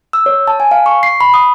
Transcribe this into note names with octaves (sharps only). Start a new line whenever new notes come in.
E6
C#5
A5
G#5
F5
C#6
C7
B5
D#6